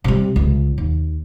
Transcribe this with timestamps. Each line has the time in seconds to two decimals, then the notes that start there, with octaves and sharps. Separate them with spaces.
0.04 C3 G3
0.36 C#2
0.78 D#2